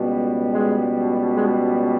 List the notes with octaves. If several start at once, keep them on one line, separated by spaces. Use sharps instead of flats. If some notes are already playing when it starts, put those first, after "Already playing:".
Already playing: C#2 B2 G3
G#3
G#3